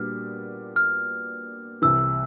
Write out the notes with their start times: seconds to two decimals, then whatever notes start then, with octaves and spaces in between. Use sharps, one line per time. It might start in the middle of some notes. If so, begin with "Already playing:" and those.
Already playing: A#2 G3 B3 D4 F#4 F6
0.76 F6
1.82 C2 C3 E3 E6